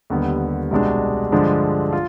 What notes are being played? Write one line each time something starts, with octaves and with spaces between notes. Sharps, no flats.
D#2 D3 G3 B3
C2 B2 G#3 D4
G2 D3 F3 G#3 D4
F4